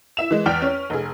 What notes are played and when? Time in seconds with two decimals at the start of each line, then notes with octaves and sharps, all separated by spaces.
0.17 E4 E5 E7
0.31 E3 G#3
0.46 E2 D5 G5 F6 B6 D7
0.62 C#4
0.90 F1 G#4